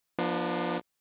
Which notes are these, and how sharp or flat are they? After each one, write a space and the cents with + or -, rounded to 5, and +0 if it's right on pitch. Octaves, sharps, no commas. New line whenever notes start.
F3 +0 B3 -35 D4 +35